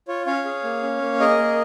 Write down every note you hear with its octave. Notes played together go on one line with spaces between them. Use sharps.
F4 C#5
C#4 C#5 F5
G#4
A#3
C#4
A#3
G#4 A#4 D#5
A#3